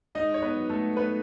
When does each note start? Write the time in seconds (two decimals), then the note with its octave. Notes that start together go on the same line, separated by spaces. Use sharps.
0.15 G#2 D#4 D#5
0.34 C#5
0.42 B3 B4
0.56 F#3
0.70 A3 A4
0.96 G#2 B3 B4